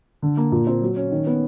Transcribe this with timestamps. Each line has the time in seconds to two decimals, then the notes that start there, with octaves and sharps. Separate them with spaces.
0.22 D3
0.37 A#3
0.52 A#2
0.67 C4
0.82 F#3
0.96 C#4
1.11 D#3
1.27 B3